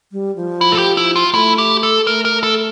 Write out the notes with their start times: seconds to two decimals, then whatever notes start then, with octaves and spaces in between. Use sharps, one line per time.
0.12 G3
0.36 F3
0.61 E4
0.72 A4
0.78 G4
0.97 E4
1.16 F4
1.33 A3 E4
1.58 G4
1.83 A4
2.06 A3 A#4
2.25 A#4
2.43 A4